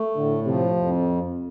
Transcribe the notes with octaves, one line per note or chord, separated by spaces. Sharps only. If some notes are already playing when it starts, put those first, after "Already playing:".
Already playing: A3
A2 D3
C3 F3
F2